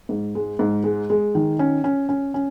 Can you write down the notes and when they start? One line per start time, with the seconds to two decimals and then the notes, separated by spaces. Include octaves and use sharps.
0.09 G#2
0.35 G#3
0.59 G#2
0.84 G#3
1.10 G#3
1.35 D#3
1.59 C#4
1.84 C#4
2.09 C#4
2.34 C#4